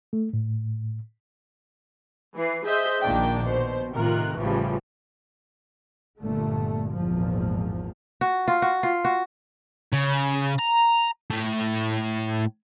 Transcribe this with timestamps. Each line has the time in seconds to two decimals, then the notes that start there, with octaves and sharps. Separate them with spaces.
0.13 A3
0.33 A2
2.35 E3 C7
2.66 G#4 C5 D#5 E5 G6
3.01 A#1 A#2 D#3 A#3 D4 G5
3.44 B2 C5
3.92 A2 C3 D#3 F4 A#4 F#6
4.36 A1 A2 C#3 E3 F3 G3
6.20 G1 A#2 D3 A3
6.93 G#1 E2 A#2 F3
8.21 F#4
8.48 F4
8.62 F#4
8.83 F4
9.05 F#4
9.92 C#3
10.59 A#5
11.30 A2 A3